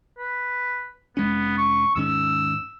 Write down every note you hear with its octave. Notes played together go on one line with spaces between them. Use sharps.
B4
F1 G#3 B3 C#4
C#6
D#2 G#2 C#4 E6